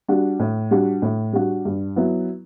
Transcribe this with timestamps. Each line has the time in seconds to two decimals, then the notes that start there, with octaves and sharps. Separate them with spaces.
0.08 G3 D4 F#4
0.39 A2
0.71 G3 D4 F#4
1.02 A2
1.33 G3 D4 F#4
1.65 G2
1.96 F#3 B3 E4